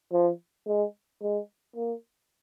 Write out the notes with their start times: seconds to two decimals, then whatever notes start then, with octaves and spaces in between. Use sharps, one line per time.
0.13 F3
0.68 G#3
1.23 G#3
1.76 A#3